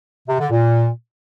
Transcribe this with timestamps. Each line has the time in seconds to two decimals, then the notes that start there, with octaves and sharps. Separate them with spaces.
0.28 C3
0.39 D3
0.51 A#2